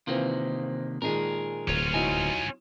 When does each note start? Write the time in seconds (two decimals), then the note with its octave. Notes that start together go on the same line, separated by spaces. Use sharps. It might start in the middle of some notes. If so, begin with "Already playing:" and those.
0.07 C3 D#3 E3 A#3 C4 F4
1.02 A#2 D#3 G#3 G#4 A#4
1.68 D1 C#4 F4
1.94 F#3 D#4 E4 G#5